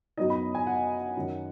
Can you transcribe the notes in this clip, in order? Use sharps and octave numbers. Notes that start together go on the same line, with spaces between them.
F#2 F#3 B3 D#4 D#5
B5
G#5
F#5
F#2 D#3 F#3 C#4